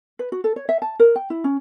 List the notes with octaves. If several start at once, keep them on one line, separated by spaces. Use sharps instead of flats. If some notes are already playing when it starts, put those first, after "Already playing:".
B4
F#4
A4
C#5
E5
A5
A#4
G5
E4
C#4